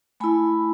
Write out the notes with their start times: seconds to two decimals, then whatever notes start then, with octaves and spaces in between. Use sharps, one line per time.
0.20 A3 E4 G#5 B5